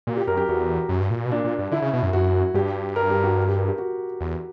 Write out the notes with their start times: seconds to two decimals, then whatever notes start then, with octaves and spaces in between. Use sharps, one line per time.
0.07 A#2 F#4
0.17 G4
0.27 F#2 A#4
0.37 G4
0.49 E2 F#4
0.89 F#2
1.00 G2
1.10 A#2
1.25 B2
1.31 A#2 D4
1.44 A#2
1.59 G2
1.72 D3 E4
1.82 C#3
1.93 B2
2.03 F#2
2.13 F#2 F#4
2.54 G2 G4
2.96 A#4
3.10 G4
3.24 F#4
3.38 A#4
3.48 G4
3.58 A#4
3.68 G4
3.78 F#4
4.21 E2